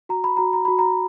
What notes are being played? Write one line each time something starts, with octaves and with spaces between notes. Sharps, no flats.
F#4 A#5
B5
F#4 A#5
A#5
F#4 B5
A#5